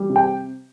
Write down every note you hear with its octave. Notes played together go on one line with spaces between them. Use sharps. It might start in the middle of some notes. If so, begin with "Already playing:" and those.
Already playing: G3
C3
G5